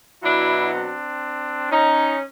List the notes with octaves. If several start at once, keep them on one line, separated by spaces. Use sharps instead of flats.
B2 F#3 D4 E4
C4 D4
C#4 D#4